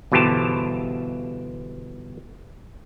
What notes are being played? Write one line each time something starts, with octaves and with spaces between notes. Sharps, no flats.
G1 B2 E3 G4 C5 A5